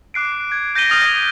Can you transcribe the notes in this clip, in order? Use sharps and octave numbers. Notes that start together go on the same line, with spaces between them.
D6 F#6 C7 D7
F#6 G#6
G6 A#6 B6 D#7 G7
D#6 F6 A6 A#6 C7 D#7